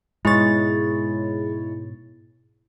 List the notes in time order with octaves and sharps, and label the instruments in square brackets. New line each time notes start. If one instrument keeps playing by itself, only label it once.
[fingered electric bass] G#2 B2 [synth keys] G#3 C#5 [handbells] E4 A6